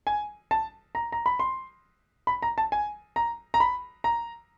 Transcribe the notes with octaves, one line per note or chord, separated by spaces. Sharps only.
G#5
A5
A#5
A#5
B5
C6
B5
A#5
A5
G#5
A#5
A#5
B5
A#5